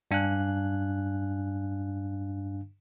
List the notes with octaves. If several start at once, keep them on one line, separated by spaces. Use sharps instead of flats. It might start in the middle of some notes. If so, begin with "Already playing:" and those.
G2 D4 F5 G#5 F#6